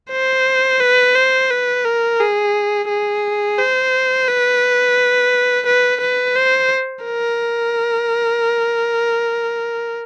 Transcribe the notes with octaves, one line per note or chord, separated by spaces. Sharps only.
C5
B4
C5
B4
A#4
G#4
G#4
C5
B4
B4
B4
C5
A#4